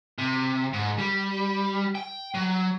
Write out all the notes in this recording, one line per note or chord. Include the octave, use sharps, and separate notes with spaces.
C3
G#2
G3
G5
F#3